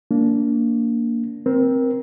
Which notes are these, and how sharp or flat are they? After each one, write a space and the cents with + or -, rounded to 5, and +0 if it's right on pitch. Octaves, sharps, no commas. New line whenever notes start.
A#3 -10 D4 -25
C4 +0 A#4 +25